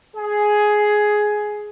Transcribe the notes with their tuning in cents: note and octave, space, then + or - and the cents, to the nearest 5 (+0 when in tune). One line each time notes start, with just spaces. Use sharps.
G#4 +10